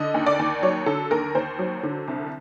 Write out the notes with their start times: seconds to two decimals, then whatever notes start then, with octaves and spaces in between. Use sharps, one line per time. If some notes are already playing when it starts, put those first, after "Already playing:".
Already playing: D3 D#5
0.14 D#2
0.26 D5
0.39 D#2
0.63 F#3 C#5
0.86 D3 A4
1.11 D#2 A#4
1.35 D#2 C5
1.59 F#3
1.83 D3
2.08 C2